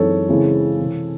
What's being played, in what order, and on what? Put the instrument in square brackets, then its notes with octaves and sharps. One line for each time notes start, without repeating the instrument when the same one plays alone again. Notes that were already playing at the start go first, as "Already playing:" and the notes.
Already playing: [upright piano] F#2 E3 G#3 C4 D#4 [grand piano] A4 C#5
[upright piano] C#3 E3 G#3 C4 E4
C3 E3 C4